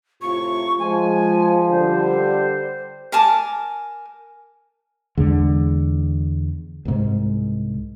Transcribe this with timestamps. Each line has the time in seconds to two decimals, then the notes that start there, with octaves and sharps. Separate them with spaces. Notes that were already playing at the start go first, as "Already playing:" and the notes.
0.22 A2 C3 F4 C#6
0.79 F3 G#3 G#5
1.69 D3 G3 C5
3.12 A#4 G#5 A5 D6
5.18 E2 D3 G#3
6.85 C2 G#2